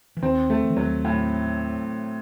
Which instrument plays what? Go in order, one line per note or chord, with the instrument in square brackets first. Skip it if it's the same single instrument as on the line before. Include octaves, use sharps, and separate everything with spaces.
[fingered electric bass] E3
[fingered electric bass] D#2 D#3 [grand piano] C4
[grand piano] A3
[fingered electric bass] D#3
E3
[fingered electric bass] D#2 D#3 [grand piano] F#3
[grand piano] A2